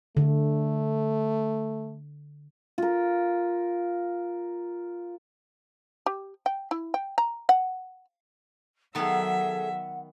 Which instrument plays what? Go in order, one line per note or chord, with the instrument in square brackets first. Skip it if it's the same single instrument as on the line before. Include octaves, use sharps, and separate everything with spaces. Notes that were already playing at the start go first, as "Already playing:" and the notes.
[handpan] D3 [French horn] A3
[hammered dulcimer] F4 A#4
[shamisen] G4
G5
E4
G5
A#5
F#5
[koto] D#3 B3 [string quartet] F#3 E5 [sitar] G#4 A4 [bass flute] F#5